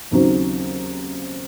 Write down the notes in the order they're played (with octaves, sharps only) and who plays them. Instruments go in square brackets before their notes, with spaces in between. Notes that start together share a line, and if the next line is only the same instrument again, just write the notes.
[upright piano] D#2 C#3 F#3 C4 D#4